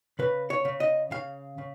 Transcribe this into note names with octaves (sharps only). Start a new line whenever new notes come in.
C#3 B4
C#5
C#3
D#5
C#3 F5
C#3